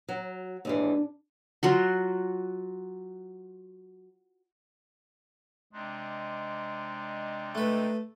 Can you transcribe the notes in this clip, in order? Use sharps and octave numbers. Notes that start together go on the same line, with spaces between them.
F#3
D#2 G#2 E3 D4
F#3 F4 F#4
C3 G#3 D4 D#4
A3 B4